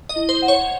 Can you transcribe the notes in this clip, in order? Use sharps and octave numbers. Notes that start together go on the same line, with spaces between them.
D#5
E4
C5
F#5
C#5